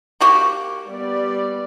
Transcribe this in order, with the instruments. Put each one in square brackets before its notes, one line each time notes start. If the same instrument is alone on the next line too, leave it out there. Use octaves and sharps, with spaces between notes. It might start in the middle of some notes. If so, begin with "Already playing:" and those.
[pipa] A#3 F#4 G4
[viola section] G3 B3 D5